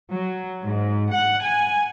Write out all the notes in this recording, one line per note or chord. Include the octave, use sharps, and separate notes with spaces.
F#3
G#2
F#5
G#5